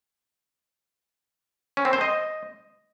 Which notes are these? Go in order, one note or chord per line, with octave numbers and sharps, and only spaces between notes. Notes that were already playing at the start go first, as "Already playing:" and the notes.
C#4
C4
C5
D#5